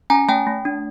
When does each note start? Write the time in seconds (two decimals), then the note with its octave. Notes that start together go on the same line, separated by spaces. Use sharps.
0.10 C#4 G#5 A#5
0.28 A3 G5 A5
0.47 A3
0.65 D4